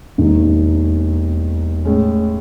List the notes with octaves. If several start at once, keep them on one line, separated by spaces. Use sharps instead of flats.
E1 D#2 D#3
A2 G#3 C#4